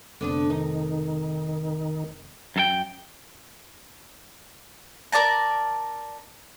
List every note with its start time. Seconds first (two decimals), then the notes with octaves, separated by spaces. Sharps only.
0.21 F1 D3 B3 D4
0.50 D#3 D#4
2.56 F#2 A4 G5
5.12 A#4 D5 A5 A#5